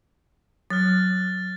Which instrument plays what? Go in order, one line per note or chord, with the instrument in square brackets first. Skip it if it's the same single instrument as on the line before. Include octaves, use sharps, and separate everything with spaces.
[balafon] F#3 [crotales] F6 F#6 A6